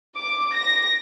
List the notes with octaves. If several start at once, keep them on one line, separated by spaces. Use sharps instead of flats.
D6
A#6